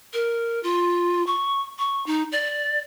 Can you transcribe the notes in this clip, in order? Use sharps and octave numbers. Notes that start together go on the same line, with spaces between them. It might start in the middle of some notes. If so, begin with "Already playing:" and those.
A#4
F4
C#6
C#6
D#4
D5